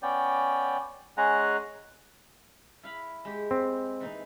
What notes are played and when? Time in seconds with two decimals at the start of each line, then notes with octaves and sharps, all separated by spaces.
0.02 B3 C#4 D5 G5
1.17 G#3 C#4 G#4 F#5 A#5
2.83 E4 F5 B5
3.25 G#3 G4
3.51 C4
4.01 E3 D#4